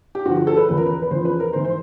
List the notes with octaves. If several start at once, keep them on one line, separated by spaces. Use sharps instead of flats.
G4
G2 D3 F3 F#4
F#4
A4
B4
E2 C#3 F3 B4
A#4
B4
B4
E2 C#3 F3 C5
B4
A#4
G#2 E3 C5
C5